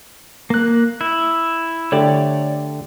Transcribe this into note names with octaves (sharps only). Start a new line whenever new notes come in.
A#3 F#6
E4
D3 A3 G4 C#5 D5